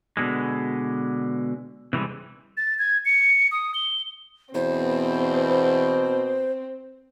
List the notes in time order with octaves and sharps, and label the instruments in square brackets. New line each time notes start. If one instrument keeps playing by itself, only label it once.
[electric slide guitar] B2 D3 G#3
C3 E3 G3 G#3
[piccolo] A6
G#6
C#7
D#6
G7
[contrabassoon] E2 [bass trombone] B2 [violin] C4 [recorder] C5